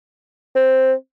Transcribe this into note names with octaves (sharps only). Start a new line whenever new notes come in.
C4